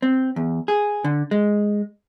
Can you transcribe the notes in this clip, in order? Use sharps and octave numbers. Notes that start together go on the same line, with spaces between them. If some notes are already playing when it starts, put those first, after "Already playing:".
C4
E2
G#4
D3
G#3